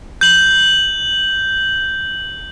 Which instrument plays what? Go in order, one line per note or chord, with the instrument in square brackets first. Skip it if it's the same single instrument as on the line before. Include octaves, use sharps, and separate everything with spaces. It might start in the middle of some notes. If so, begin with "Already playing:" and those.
[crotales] G6 F#7